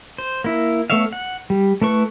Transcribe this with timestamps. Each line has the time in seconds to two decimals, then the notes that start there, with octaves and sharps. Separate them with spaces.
0.18 C5
0.44 A#3 E4
0.90 A3 B3 C#5 E5 F5
1.13 F#5
1.50 G3
1.81 A3 E4 B4 C#6